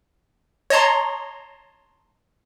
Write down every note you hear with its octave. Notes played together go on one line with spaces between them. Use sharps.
C#5 D#5 A5 A#5 C6